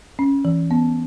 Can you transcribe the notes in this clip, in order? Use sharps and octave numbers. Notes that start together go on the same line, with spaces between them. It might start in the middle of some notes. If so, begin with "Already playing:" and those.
C#4
E3
B3